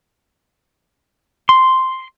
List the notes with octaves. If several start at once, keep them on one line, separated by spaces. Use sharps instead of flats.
C6